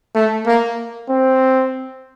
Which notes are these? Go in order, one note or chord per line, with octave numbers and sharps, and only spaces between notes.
A3
A#3
C4